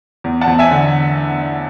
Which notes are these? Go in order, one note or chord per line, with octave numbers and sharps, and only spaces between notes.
E2
F#5 A5
E2
E5 G#5
D3